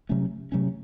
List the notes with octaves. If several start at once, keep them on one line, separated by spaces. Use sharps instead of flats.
C3 F#3 A3 C#4
C3 F#3 A3 C#4